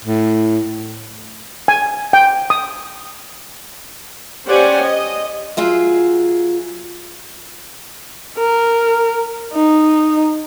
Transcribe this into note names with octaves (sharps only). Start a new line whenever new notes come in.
A2
G#5
G5
D#6
C#4 G4 C5 D5 F#5 G#5
D#5
F#3 F4 G#4 E5
A#4
D#4